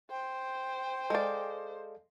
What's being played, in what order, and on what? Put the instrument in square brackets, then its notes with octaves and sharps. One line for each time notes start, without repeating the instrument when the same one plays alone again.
[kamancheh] C5 [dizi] G5
[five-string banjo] G#3 D5 [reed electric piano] A4 F5